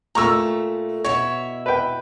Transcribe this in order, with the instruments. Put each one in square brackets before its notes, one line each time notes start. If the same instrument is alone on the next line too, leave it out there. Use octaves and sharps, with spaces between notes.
[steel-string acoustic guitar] A#2 A3 [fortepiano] A#5 C#6 E6
[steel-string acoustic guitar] B2 E4 E5 [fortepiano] C#5
[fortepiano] B4 G5